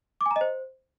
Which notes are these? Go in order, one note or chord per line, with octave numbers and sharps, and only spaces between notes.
D6
G#5
A#5
D#5
C5